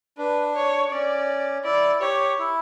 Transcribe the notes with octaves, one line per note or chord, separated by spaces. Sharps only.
D4 B4
C#5
C#4 D5
E4 D5
G4 C#5
E4